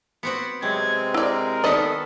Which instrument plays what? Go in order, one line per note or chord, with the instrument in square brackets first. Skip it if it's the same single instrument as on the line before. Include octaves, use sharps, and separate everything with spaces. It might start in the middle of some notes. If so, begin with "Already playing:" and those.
[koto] B3 C4 F#4
[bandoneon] C3 G#3 C4 [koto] F#3 [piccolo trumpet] G#6
[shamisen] E4 D5 [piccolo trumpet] A#4
[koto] D#3 B3 [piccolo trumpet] A4 [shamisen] D5 D#5